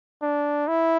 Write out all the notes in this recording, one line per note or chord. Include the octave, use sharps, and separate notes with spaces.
D4
E4